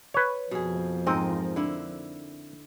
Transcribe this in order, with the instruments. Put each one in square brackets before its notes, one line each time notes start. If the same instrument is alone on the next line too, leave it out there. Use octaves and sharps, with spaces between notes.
[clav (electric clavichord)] B4 C#5
[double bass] F2 F3 [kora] B2 G#4
[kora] G#2 A#4 D#5 [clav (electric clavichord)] C4
[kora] D3 E4